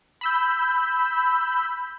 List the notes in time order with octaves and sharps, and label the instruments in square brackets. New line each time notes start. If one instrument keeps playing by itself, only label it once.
[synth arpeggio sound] B5 E6 G6